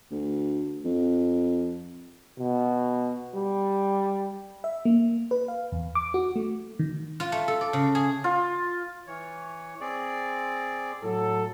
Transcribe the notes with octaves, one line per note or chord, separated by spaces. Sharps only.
D2
F2
B2
G3
E5
A#3
B4
F5
E2
D6
F#4
A3
D#3
F4
A3
A4
D5
C#3
G#4
F4
E3 C#5
C4 G#4 D5
A2 F#3 A4